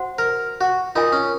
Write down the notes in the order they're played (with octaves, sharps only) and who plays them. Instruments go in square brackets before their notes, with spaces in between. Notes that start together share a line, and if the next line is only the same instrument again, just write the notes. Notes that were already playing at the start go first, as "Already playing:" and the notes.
Already playing: [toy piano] F#4 C5 F#5
[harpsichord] A#4
F#4
[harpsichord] D#4 [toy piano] F4 A#4 D#5 G#5
[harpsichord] C#4